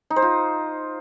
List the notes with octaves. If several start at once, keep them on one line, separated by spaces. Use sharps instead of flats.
D#4
C5
F4